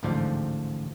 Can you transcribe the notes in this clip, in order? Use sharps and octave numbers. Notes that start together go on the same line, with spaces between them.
A1 D2 G#2 F3 D5 G5